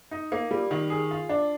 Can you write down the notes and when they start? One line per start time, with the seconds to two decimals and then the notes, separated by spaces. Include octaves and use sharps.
0.11 D#4
0.32 A#3
0.51 G3
0.71 D#3
0.90 G#4
1.11 F4
1.29 D4